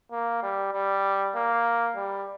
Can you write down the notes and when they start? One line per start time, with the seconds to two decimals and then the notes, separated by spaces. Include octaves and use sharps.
0.12 A#3
0.43 G3
0.73 G3
1.36 A#3
1.96 G3